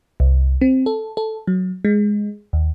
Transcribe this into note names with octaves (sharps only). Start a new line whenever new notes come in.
C2
C4
A4
A4
F#3
G#3
D#2